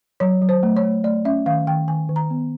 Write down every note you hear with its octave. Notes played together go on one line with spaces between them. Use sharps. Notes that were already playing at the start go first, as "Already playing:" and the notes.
F#3 C#5
F#3
C5
A3
C#5
A3
A3 D5
C#4 E5
D#3 F5
D#3 G5
D#3 G#5
D#3
A#5
B3